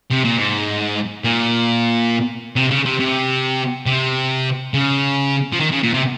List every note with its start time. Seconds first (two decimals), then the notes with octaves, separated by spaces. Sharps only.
0.11 C3
0.25 A#2
0.37 G#2
1.24 A#2
2.56 C3
2.70 C#3
2.85 C3
2.99 C3
3.86 C3
4.74 C#3
5.53 F3
5.61 D#3
5.72 C#3
5.83 A#2
5.94 C3